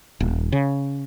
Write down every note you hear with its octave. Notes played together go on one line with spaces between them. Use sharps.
D#1
C#3